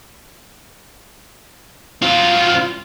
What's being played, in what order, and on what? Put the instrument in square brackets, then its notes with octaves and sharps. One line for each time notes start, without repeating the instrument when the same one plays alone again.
[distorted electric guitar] F#3 C4 [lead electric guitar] F4